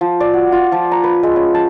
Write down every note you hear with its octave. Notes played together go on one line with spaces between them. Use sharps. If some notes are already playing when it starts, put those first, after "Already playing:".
F3
D5
F#4
F4
F3
A#5
B4
G#3
C#4
A5